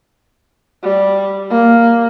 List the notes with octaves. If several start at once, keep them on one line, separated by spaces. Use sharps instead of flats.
G3
A#3